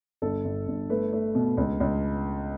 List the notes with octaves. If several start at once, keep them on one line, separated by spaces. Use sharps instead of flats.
G1 A4
G1
G1
A3 B4
A3
B2
C#2
C#2